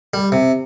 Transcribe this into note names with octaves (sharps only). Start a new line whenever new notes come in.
G3
C3